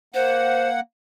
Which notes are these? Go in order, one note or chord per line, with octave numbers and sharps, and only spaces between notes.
A#3 C5 F#5